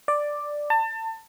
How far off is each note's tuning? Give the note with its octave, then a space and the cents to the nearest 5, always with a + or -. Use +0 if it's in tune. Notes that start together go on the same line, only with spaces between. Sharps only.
D5 +5
A5 +30